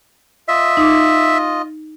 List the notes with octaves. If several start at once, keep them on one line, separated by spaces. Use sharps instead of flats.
F4 D#5 E5
D#4 D6